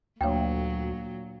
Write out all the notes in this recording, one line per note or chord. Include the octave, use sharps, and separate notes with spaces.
D2 A#2 F#3 A#3 D4 C#5 F5 G5